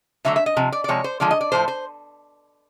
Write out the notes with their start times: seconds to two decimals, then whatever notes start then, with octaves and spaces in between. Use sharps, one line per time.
0.25 D3 F#3 A3 E5
0.36 E5
0.46 D#5
0.57 C3 F3
0.72 D5
0.84 D5
0.88 C3 F3 G#3 C#5
1.04 C5
1.20 D3 F3 G#3 D5
1.31 D#5
1.41 D5
1.52 A2 F3 A3 C5
1.68 C5